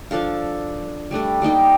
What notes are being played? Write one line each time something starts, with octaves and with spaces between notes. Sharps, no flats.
F3 D4 A4 F5
G3 A3 D4 A4
G3 A#3 D#4 G4